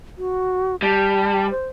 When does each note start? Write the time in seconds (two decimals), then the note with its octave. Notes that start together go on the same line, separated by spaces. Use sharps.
0.18 F#4
0.82 G3 A5
1.50 C5